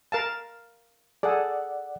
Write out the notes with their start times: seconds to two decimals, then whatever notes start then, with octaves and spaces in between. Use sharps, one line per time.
0.12 A#4 F5 A5
1.23 G#4 A4 D5 F#5